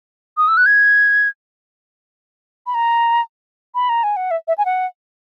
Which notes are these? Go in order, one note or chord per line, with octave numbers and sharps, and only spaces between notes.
D#6
E6
F#6
G#6
B5
A#5
B5
A#5
G#5
F#5
E5
E5
G#5
F#5